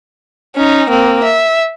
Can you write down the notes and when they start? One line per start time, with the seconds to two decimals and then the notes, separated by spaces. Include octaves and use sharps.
0.55 C#4 D#4
0.90 A#3 C4
1.23 E5